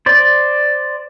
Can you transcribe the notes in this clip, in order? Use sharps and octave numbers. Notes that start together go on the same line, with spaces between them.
C5 D5